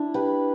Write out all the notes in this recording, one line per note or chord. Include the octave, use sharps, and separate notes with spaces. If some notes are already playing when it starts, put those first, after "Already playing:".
Already playing: D4 E4
G4 B4